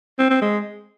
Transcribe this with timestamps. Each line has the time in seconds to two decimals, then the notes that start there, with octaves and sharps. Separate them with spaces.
0.19 C4
0.30 C4
0.42 G#3